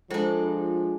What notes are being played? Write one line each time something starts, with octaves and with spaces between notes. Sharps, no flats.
F3 G#3 D4 F4 A4 C5